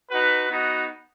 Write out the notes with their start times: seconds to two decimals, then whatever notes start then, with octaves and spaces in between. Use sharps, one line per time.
0.10 D#4 F#4 B4
0.48 B3 D#4 F#4